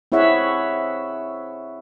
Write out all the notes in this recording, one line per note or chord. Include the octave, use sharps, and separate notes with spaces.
C4 E4 G#4 C#5 E5 F#5